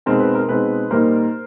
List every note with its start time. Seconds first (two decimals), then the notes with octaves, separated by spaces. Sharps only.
0.06 B2 G#3 C4 D#4 A#4
0.20 B4
0.35 A#4
0.48 B2 G#3 C4 D#4 B4
0.91 A#2 G3 A#3 D#4 A#4 C5